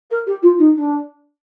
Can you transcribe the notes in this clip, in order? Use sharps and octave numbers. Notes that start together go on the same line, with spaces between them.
A#4
G4
F4
D#4
D4